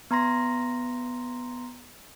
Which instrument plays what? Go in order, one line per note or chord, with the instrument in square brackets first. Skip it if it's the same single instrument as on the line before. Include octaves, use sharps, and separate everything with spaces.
[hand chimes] B3 A#5 C6 A#6